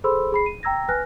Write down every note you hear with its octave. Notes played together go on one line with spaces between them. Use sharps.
G#4 A4 C5 B5 C6 E6
G#4 B5 C7
D#7
G5 A#5 E6 G#6 A#6
B4 G#5 F6 F#6 A#6